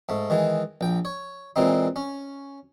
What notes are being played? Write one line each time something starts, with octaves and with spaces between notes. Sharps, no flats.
G#2 A3
D#3 E3 G#3
A#1 G5
C#5
A#2 E3 G#3 C4 D#4
C#4